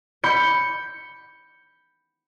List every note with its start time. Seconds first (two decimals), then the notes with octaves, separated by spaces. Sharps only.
0.24 B5 G6 C#7